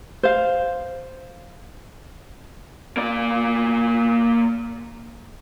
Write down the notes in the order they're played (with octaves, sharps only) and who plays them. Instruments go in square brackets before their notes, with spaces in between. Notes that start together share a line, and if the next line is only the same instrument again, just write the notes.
[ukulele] C5 F5
[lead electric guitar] A#3 D5